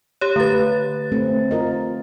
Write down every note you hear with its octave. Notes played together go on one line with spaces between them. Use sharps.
G4 C#5
D3 A3 B4 A6
A3 C4
F4 A#4 D#5